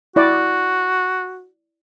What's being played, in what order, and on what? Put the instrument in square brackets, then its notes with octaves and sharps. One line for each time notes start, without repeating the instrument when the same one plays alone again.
[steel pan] E4 D5 [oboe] F#4